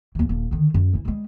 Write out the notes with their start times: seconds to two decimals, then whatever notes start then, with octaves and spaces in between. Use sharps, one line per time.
0.15 D#2 E3
0.29 D#1
0.51 D3 D#3
0.74 F#2
0.93 E3 E4
1.05 G3 G#3